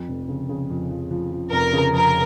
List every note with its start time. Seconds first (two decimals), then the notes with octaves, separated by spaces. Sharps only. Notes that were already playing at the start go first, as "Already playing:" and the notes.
Already playing: F2
0.08 F1
0.29 C#3
0.49 C#3
0.70 F2
0.90 F3
1.11 F3
1.32 F3
1.52 F1 A#4
1.73 C#3
1.94 F2 A#4